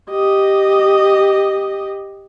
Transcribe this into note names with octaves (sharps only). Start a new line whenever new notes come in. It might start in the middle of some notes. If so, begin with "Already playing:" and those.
G4 D#5